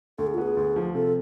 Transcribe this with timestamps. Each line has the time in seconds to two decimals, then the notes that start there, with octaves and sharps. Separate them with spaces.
0.18 D2 A4
0.27 G#4
0.34 F4
0.38 B3 G#4
0.57 D2
0.76 F3
0.95 C3 A4